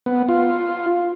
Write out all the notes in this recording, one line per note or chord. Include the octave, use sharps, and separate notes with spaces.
B3
F4